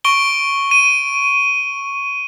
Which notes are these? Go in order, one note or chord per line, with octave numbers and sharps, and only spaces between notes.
C#6 D7 G7
D#7